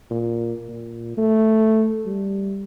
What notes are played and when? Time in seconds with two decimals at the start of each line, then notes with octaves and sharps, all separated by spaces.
0.11 A#2
0.69 A#2
1.17 A3
2.06 G3